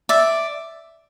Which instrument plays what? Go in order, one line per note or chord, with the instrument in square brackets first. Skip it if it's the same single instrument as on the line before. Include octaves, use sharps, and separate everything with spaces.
[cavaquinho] D5 E5